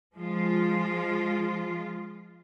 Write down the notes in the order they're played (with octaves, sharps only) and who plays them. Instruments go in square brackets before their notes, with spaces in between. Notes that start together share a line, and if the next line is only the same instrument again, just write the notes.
[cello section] F3 G#3 F4